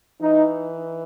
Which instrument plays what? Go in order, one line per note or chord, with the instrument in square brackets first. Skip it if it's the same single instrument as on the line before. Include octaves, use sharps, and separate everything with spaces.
[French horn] E3 [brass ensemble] D#4